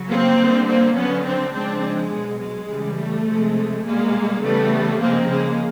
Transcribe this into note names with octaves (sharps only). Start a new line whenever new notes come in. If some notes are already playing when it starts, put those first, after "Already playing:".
Already playing: C#3 F#3
A#3 C4
D3 G3
A#3 C4
D3 F#3 B3 C#4
C4 D4
C#3 F3 G#3 C4 D4
G#3
B2 F#3
G#3
C#3 E3 G3
A3
C3 F3 G#3
B2 G3 G#3 A#3
C#3 E3 G3 A3 B3
C#3 F3 G#3 A#3 C4
G#3 A#3